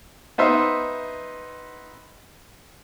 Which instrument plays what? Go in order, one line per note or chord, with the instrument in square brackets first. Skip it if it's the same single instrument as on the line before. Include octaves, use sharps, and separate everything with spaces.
[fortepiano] B3 D#4 C5 E5